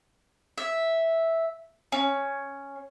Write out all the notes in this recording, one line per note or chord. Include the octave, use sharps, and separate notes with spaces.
E5
C#4